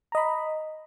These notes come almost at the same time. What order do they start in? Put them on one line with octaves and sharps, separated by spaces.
A#5 D#5 B5